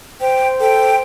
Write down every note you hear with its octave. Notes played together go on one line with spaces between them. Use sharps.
C5 G5
A4 G5